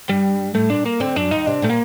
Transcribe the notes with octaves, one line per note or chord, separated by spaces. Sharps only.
G2 G3
A2 A3
A#2 D4
A#3
D2 D3 C4
F#2 F#3 D4
D#2 D#3 D#4
C3 D4
A#2 A3
A#3